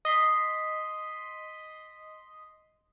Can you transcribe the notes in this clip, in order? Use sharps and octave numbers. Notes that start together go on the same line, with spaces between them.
D#5 C6 B6